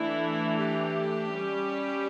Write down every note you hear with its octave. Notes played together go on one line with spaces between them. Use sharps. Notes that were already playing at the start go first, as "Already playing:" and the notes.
Already playing: E3 A3 D4 E4
G4
G3 C#4